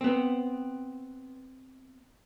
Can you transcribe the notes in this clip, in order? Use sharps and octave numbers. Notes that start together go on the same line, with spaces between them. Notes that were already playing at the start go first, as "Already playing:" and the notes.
B3 C4